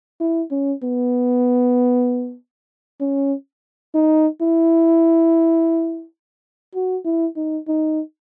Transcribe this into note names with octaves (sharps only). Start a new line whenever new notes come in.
E4
C#4
B3
C#4
D#4
E4
F#4
E4
D#4
D#4